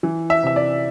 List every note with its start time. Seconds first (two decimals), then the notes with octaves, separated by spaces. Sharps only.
0.03 E3
0.30 E5
0.43 C3 E5
0.56 D5